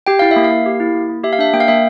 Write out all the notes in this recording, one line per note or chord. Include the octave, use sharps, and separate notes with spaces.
G4 G5
E4 F5
E5
A#3
F5
A#3
G4
E4
A#3
A#3
G4 E5
F5
D4 E5
A#3 G5
F5
A#3 E5